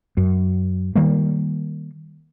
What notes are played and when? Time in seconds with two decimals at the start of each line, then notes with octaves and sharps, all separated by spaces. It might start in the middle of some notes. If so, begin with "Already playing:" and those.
0.17 F#2
0.95 D#3 G3 A#3